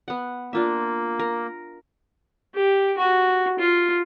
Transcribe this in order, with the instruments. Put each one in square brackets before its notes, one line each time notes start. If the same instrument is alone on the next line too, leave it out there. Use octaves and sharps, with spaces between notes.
[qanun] B3 F#5
[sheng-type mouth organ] A#3 [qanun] D4 F4 E5
[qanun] A#4
[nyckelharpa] G4
F#4
F4